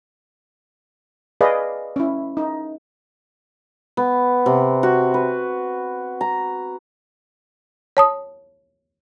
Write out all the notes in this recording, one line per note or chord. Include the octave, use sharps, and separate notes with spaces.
G#4 B4 D5 D#5 F5
C#4 E4
D#4
B3
C3
F#4
B4
A#5
C#5 A5 D#6